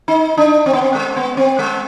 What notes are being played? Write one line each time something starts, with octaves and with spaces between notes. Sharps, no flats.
D#4
D4
C4
B3
C4
G#3
B3
C4
G#3